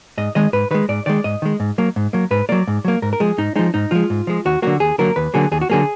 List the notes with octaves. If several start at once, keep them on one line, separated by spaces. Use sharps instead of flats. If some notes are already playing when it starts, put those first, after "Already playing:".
G#2 D#5
D#3 G#3 D#5
G#2 B4
D#3 G#3 B4
G#2 D5
D#3 G#3 D5
G#2 D#5
D#3 G#3
G#2
F#3 A#3
G#2
F#3 A#3
G#2 B4
F#3 A#3 D5
G#2
F#3 A#3
G#2 A#4
A#4
F3 G#3 G#4
G#2 D#4
F3 G#3 D#4
G#2 D#4
F3 G#3 F4
G#2
F3 G#3
D#2 F#4
D3 F#3 A#3 F#4
D#2 G#4
D3 F#3 A#3 A#4
D#2 B4
D3 F#3 A#3 G#4
D#2 G#4
F#4
D3 F#3 A#3 G#4